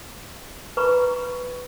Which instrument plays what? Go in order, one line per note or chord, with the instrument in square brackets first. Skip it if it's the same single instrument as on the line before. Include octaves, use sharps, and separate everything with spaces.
[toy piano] B4 A#5 B5 C#6